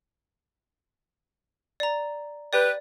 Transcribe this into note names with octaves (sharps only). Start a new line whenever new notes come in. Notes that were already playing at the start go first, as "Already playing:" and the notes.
D5 A#5
G4 B4 D5